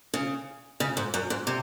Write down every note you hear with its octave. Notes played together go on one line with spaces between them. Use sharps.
C#3
C#3
G#2
F#2
G#2
C3